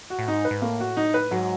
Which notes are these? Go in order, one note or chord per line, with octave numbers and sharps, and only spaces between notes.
F#4
A2
G#2 D#4
B4
G#2
A2 A#3
F#4
D#4
B4
G#2 F#3